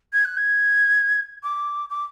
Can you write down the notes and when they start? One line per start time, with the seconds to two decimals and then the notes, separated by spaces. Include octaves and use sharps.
0.13 G#6
0.24 F#6
0.37 G#6
1.43 D6
1.89 D6